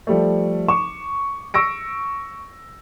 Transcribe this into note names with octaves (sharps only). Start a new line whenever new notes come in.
F3 G3 A3
C#6 D6 E7
C#6 E6 A#6 D7